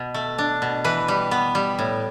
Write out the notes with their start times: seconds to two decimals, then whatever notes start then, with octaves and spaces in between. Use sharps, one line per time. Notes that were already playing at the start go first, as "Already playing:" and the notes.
Already playing: B2
0.14 A3
0.38 D4
0.62 B2
0.84 E3 B4
1.08 G3
1.31 B3
1.55 G3
1.79 A2